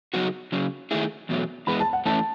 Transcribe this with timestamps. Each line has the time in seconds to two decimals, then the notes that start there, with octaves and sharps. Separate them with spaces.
0.14 C#3 F#3 B3 D#4 F#4
0.52 C#3 F#3 C#4
0.91 D#3 A3 E4 G#4
1.29 E2 B2 F#3 A3
1.67 E3 G#3 B3 B5
1.80 A5
1.93 F#5
2.06 E3 A3 C#4 E4 A5